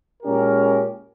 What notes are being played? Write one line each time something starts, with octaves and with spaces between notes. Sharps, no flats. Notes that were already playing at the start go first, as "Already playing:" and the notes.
A#2 G#3 C#4 G4 A#4